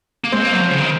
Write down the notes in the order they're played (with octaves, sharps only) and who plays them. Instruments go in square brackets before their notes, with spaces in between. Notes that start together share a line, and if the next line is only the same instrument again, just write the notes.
[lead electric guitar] A#3
[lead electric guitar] G#3 [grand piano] C4
[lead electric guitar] A#3
F#3
F3
C#3
D#3